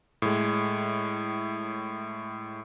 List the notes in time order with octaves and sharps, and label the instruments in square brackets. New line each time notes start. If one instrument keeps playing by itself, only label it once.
[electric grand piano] A2 G#3